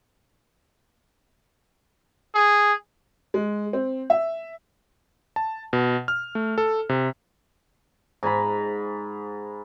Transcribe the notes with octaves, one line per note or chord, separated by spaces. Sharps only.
G#4
G#3
C4
E5
A5
B2
F6
A3
A4
C3
G#2 G#5 A#5 B5